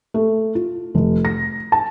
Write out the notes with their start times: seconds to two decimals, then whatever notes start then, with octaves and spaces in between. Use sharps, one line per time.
0.14 A3
0.55 F4
0.95 F1
1.25 A#6
1.72 A5